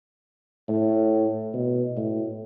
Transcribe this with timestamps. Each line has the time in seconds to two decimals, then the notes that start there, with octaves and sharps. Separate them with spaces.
0.68 A2
1.54 B2
1.97 A2